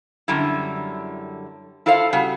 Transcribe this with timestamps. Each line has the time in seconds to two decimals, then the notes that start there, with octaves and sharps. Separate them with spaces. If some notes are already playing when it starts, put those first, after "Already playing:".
0.28 F#2 D3 G3 E4
1.86 E4 F4 A4 C5 F5
2.13 C#3 G3 F#4